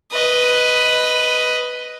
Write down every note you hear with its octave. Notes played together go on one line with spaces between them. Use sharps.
B4 D#5